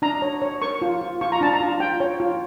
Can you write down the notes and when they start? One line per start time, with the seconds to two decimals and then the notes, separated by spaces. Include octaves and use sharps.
0.02 D4 A#5
0.22 C#5
0.42 C#5
0.62 A#4 C#6
0.82 F4
1.01 F4
1.21 F4 C#6
1.32 A#5
1.41 D4 A5
1.54 A#5
1.60 F4
1.80 F4 G5
2.00 C#5
2.20 F4